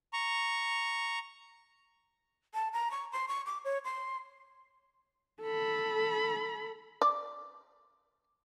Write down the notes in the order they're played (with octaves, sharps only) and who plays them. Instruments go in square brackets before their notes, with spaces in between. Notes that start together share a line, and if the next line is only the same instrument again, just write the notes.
[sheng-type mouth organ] A#5 C#6
[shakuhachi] A5
A#5
C#6
C6
C#6
D6
C#5
C6
[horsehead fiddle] A4 B5
[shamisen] D5